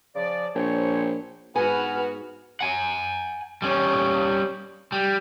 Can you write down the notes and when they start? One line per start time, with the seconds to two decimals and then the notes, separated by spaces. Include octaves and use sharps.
0.15 C#3 F3 D5
0.55 A#1 C4 C5 C#5
1.56 G#2 B3 F#4 B4 G#5 F6
2.61 F#5 G#5
3.62 G3 C#4
4.92 G3